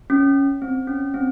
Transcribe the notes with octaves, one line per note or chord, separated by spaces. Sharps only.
C#4
C4
C#4
C4